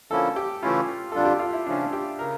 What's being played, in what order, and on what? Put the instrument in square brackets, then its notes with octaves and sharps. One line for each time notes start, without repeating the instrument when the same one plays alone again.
[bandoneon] D3 F3 A#3 C#4 E4 [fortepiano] A4
[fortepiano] G4
[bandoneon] C#3 E3 A3 C#4 E4 [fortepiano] F4
[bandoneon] F2 D3 G3 D4 F4 [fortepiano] A4
[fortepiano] G4
F4
E4
[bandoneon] C#3 F3 C#4 [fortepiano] D4
[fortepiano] G4
[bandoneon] C#3 [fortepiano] A#4